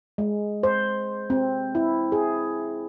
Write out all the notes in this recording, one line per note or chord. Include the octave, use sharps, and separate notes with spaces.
G#3
C5
C4
E4
G#4